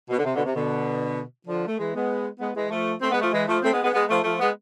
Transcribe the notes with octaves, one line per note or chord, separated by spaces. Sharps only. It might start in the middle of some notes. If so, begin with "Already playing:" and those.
B2
D3
C3
B2 D3
C3
B2 D3
D3 F3
A3
E3 G#3
G#3 B3
G#3 B3
E3 G#3
F3 A3
A3 C4
G#3 B3
F3 A3
E3 G#3
F3 A3
A3 C4
G#3 B3
G#3 B3
G#3 B3
F3 A3
F3 A3
G#3 B3